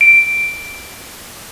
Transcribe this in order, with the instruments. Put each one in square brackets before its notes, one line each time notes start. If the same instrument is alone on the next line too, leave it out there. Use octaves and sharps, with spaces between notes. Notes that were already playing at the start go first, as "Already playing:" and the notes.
[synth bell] D7